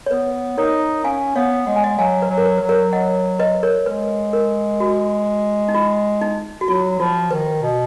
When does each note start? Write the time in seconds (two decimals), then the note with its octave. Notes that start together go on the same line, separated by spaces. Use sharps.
0.06 C#5
0.11 B3 B4
0.58 D#4 A#4 C#5
1.04 C#4 F5 G#5
1.36 B3 C#5 F5
1.67 G#3 F#5
1.76 G#5
1.84 D#5 F#5
1.98 F#3 F5 G#5
2.22 B4
2.30 F#3
2.37 A#4
2.46 B4
2.58 F#3 B4
2.69 A#4 C#5
2.93 D#5 F#5
3.39 B4 D#5
3.63 A#4 C#5
3.86 G#3 B4
4.33 A#4
4.80 F#4
5.68 D#4
5.74 F4
6.21 D#4
6.61 F#4
6.68 F#3 F4
6.99 F3 F4
7.31 D#3 B4
7.62 B2